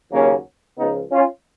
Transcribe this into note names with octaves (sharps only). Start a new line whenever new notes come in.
D#2 C#3 F#3 A#3 C#4
C#2 C#3 F3 B3 D#4
C#4 F4